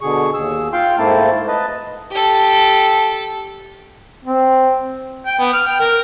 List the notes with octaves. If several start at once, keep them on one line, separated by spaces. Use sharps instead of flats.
B2 D3 G#4 C#6
D#2 G#4 E6
F4 F5 G5 C6
G#2 A3 A#3 C4 E4 A5
B4 D#5 A5
G4 A4
C4
G5
B3
F6
G5
A#4